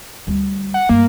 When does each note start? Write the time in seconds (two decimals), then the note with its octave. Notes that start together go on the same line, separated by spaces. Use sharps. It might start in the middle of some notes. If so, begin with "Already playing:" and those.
0.27 D2 G3
0.74 F#5
0.89 G2 A3 A#3